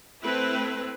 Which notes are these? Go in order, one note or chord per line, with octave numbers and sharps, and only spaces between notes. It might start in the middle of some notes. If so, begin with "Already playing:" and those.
A3 C4 E4 B4